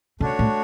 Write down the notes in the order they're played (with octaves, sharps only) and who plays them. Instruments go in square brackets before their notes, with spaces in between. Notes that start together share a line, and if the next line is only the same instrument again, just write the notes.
[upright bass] C#3 [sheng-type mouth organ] A3 D4 F#4 C#5
[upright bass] A2